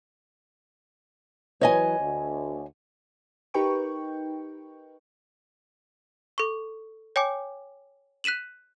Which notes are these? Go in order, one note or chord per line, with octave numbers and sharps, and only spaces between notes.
E3 F#3 B4 C#5 D#5 G#5
D2
D#4 G4 A#4 B4 G5 C#6
A4 C#6
C#5 G5 G#5 D6
F#6 B6 D#7 E7 F#7